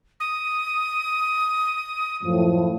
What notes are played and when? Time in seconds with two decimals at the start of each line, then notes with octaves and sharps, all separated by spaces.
0.20 D#6
2.23 F#2 A2 F3